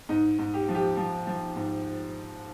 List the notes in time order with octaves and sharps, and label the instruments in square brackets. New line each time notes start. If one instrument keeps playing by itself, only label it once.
[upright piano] G#2 D#4
G#2
G4
F3
G4
F3
F3
G#2